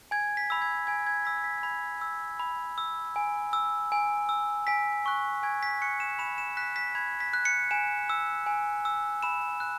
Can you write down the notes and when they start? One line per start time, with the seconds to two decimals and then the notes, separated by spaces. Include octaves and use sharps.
0.11 G#5 G#6
0.37 B6
0.50 B5 E6
0.62 G#6
0.87 G#5 G#6
1.07 G#6
1.25 B5 E6 B6
1.44 B6
1.63 B5 G#6
2.01 E6
2.40 B5
2.78 E6
3.16 G#5
3.53 E6
3.92 G#5
4.29 E6
4.67 G#5 B6
5.06 C#6 F#6
5.43 G#5 G#6
5.63 B6
5.81 C#6 F#6 C#7
6.00 E7
6.19 B5 E7
6.38 E7
6.57 F#6 B6
6.76 B6
6.95 B5 G#6
7.20 B6
7.33 F#6
7.45 C#7
7.71 G#5 E7
8.10 E6
8.46 G#5
8.85 E6
9.23 B5 E7
9.60 F#6